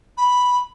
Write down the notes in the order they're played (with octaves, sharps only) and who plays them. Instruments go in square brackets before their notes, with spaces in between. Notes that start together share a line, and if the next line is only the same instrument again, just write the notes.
[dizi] B5